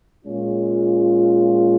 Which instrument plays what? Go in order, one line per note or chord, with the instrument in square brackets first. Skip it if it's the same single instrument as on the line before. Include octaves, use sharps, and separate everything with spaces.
[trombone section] A#2 G#3 C#4 F4